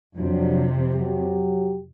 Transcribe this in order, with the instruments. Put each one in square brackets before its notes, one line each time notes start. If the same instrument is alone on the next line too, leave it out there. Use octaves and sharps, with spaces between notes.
[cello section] F2 C3 [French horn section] F3 F#3 D4
[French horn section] F#3 G4